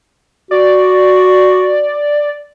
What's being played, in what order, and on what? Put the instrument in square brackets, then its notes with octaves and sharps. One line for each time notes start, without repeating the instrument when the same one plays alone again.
[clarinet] F#4 [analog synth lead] D5